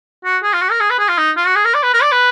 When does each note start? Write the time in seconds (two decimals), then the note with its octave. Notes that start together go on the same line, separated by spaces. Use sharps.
0.24 F#4
0.43 G#4
0.53 F4
0.61 F#4
0.71 A#4
0.80 G#4
0.90 B4
0.99 G#4
1.09 F4
1.18 D#4
1.37 F4
1.46 F#4
1.56 G#4
1.65 A#4
1.74 D5
1.83 B4
1.93 A#4
2.02 D5
2.12 B4